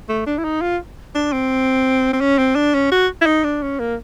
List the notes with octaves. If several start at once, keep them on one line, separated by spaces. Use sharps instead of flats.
A3
D4
E4
D#4
F4
D4
C4
C4
C#4
C4
D4
C#4
F#4
E4
D#4
D4
C#4
A#3